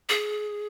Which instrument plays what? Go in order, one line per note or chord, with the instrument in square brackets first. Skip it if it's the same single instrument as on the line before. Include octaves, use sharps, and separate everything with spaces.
[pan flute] G#4